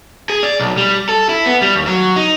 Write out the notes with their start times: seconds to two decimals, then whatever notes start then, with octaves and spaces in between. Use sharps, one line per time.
0.30 G#4
0.43 D5
0.59 B1
0.77 G3
1.09 A4
1.29 E4
1.46 B3
1.62 G3
1.75 D#2
1.87 F#3
2.16 D#4